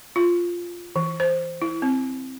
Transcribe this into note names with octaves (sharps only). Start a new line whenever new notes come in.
F4
E3
C5
E4
C4